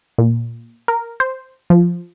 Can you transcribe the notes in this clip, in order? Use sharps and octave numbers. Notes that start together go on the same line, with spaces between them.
A#2
A#4
C5
F3